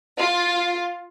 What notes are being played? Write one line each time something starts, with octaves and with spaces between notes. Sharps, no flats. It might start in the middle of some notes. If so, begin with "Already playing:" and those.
F4